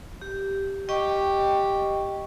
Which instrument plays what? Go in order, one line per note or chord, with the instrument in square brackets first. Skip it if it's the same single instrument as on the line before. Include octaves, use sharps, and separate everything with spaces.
[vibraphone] G4
[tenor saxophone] G4 [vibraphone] D#5 G5 C#6